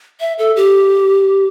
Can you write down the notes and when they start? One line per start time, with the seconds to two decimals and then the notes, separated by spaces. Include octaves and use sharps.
0.20 E5
0.39 A4
0.56 G4